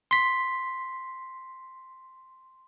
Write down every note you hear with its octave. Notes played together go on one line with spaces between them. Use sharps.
C6 B6